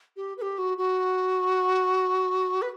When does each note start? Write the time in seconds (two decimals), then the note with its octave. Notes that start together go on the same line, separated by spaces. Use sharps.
0.16 G4
0.37 B4
0.41 G4
0.58 F#4
0.77 F#4
2.61 B4